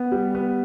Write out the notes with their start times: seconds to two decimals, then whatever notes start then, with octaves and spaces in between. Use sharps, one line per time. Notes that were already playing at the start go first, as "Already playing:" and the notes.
Already playing: B3
0.12 G3
0.35 B3